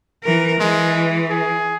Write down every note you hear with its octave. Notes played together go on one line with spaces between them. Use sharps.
E3 A#4
E3 G#3
G#4